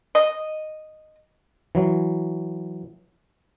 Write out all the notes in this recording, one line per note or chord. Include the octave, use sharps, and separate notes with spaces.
D#5
E3 F#3